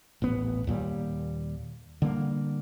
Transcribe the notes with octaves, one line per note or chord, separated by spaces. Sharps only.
D#1 A1 B3
D#2 A#2 G3
D3 G3 A#3